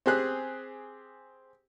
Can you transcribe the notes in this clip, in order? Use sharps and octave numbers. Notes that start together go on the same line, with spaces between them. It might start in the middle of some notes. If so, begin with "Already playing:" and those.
C4 G4 G#4 F#6